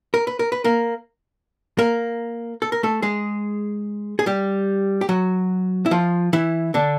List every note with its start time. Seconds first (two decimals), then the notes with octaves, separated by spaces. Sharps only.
0.14 A#4
0.27 B4
0.39 A#4
0.52 B4
0.64 A#3 A#4
1.78 A#3 A#4
2.62 A4
2.72 A#4
2.83 A3 A4
3.02 G#3 G#4
4.19 G#4
4.26 G3 G4
5.01 G4
5.09 F#3 F#4
5.86 E4
5.91 F3 F4
6.33 E3 E4
6.74 D3 D4